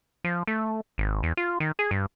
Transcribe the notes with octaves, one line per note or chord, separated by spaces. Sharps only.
F3
A3
G#1
E2
F4
D#3
G#4
G2